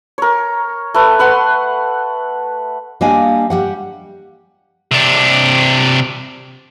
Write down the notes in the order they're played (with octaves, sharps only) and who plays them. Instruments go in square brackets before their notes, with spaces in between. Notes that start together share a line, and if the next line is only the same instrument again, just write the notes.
[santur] A#4 C#5
A3 B4
B4 F#5 C6
[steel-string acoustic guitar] G3 A#3 D4 D#5 F5 G#5
G3 G4 F#5
[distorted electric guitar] C3 D4